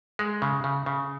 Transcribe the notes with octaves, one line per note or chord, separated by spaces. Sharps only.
G#3
C#3
C#3
C#3